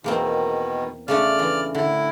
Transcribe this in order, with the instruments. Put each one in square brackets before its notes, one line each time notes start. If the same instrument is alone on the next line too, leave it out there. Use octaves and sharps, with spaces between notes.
[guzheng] E2 A#3 C4 [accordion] B2 D#3
[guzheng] C#3 A3 D4 [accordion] D5 F6
[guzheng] E3
[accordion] A2 E4 [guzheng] D3